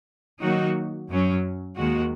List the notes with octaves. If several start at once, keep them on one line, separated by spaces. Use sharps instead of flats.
D#3 F#3 A#3 D#4 F#4
F#2 F#3 C#4
D#2 D#3 G#3 F#4